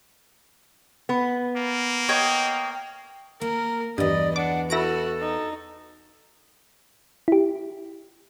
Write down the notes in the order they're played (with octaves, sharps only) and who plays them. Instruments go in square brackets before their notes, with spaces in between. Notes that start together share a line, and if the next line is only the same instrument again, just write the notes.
[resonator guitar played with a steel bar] B3
[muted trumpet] A#3
[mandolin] C#5 D#5 G5
[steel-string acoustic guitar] A#3 [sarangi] A#4
[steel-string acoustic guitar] E2 B4 [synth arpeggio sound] G2 [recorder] D5 [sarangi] D#5
[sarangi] D4 [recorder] F#5 [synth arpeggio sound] D6
[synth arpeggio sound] E4 A#6 D7 [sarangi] F#4 [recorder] A4
[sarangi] D#4
[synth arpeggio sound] E4 G4